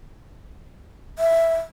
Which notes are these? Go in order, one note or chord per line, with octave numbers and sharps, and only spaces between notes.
E5